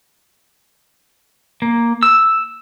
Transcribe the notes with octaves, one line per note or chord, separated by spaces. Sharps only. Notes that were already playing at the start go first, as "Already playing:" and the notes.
A#3
E6